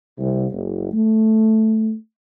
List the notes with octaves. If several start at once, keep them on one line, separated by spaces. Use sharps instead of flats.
C2
F#1
A3